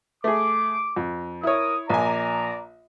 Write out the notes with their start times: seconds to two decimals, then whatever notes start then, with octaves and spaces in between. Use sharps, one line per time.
0.24 A3 G#4 D6
0.96 F2
1.43 E4 A#4 C#5 D#6
1.90 A#1 D5 G#5 A#5